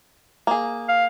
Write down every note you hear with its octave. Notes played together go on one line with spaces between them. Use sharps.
A#3 G#4
F5